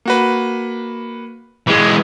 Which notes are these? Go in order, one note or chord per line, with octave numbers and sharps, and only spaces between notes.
A#3 F#4 B4
E3 G#3